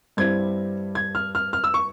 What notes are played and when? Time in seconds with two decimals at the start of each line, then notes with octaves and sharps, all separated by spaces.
0.17 G2 G3 C4 E4 G#6
0.95 G#6
1.15 F6
1.35 F6
1.53 F6
1.64 E6
1.74 C#6